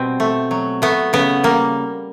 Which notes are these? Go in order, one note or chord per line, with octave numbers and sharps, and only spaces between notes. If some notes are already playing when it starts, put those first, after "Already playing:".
Already playing: B2 G3 C4
A3
F#3
A3 B3
C#3 B3
G3 A#3